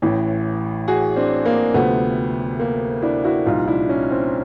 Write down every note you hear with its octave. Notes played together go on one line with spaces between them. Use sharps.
A1 A2 E3
F#4 G#4
C4 D4
A#3
D2 C3 F3 A3 B3
A#3
D4 E4
E4 F#4
C2 A#2 F3 D#4 F4
D4 E4
C#4 D#4
C4 D4